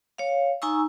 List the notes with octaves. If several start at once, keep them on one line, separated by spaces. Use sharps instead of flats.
C#5 F5
D#4 G#5 A#5 C#6 E6